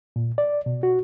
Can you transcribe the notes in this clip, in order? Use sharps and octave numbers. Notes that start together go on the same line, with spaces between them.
A#2
D5
B2
F#4